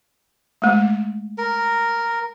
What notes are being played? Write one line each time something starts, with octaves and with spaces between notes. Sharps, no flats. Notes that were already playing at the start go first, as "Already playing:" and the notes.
G#3 A3
A#4